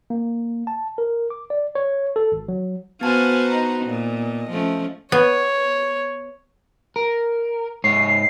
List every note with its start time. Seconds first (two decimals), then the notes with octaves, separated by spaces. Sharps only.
0.10 A#3
0.67 A5
0.98 A#4
1.30 D6
1.50 D5
1.75 C#5
2.16 A4
2.32 G#1
2.48 F#3
3.01 B3 F#4 B4 C5 F5 G#5 A5
3.48 D#4 A#5
3.85 A#2 D#5
4.50 F3 A3 C#4
5.12 B3 C#5
6.96 A#4
7.84 G#2 C#5 C7